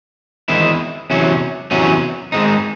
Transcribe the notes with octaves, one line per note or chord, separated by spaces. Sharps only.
E2 D#3 G#3 C4 E4
E2 C3 F#3 C#4 F#4
E2 C3 F#3 C#4 F#4
G#2 D#3 G#3 C4 D#4